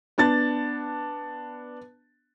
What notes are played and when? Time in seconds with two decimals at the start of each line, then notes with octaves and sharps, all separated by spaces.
0.18 B3 D4 A5 A6